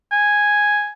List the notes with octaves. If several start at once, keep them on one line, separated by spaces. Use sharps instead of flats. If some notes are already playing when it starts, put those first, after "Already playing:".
G#5